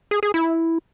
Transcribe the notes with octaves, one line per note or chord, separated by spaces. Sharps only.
G#4
G#4
E4